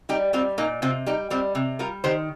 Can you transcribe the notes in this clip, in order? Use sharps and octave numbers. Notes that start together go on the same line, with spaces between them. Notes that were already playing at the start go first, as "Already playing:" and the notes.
G3 D#4 G4
G3 C4 F4
A#2 A#3 D#4
C3 C4 F4
G3 D#4 G4
G3 C4 F4
C3
G3 F4 A#4
D#3 G4 C5